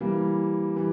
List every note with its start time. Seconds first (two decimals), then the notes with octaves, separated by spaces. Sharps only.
0.01 E3 G3 A#3
0.76 E3 G3